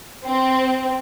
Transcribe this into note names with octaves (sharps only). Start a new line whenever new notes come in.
C4